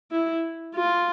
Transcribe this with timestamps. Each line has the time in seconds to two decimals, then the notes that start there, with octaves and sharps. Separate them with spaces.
0.12 E4
0.75 F4